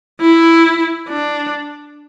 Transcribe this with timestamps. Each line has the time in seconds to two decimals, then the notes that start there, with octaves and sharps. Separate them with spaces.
0.21 E4
1.09 D4